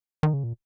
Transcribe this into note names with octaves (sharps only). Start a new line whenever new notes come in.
D#3
C#3
A#2